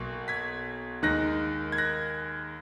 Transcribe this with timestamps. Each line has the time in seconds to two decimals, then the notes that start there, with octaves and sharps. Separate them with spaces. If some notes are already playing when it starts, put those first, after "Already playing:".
Already playing: B1 B2 A#3
0.28 G#6 B6
1.03 D#2 D#3 G#3 D#4 F#6 A#6
1.72 G#6
1.78 F#6 A#6